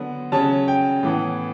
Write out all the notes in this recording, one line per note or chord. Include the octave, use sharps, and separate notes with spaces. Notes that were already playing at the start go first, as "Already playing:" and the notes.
Already playing: D3 F#3 B3
C#3 F#3 C#4 A5
G5
A2 E3 B3